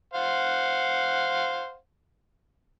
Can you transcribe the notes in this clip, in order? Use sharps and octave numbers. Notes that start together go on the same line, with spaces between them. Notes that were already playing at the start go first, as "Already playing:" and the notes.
C5 F5 F#5